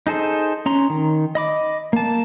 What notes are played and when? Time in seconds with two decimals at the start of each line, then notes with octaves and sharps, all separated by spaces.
0.07 D#4 G#4 A4 C5
0.66 C#4 A#5 C6
0.90 D#3
1.35 D#5 B5 D6
1.93 A#3 A5